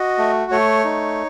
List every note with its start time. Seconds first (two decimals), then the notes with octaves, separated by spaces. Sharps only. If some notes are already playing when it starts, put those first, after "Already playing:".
Already playing: F#4 D#5
0.18 A3
0.51 A3 C#5
0.85 D#4